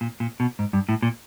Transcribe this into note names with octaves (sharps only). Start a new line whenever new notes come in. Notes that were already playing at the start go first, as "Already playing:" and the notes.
A#2
A#2
B2
G#2
G2
A2
A#2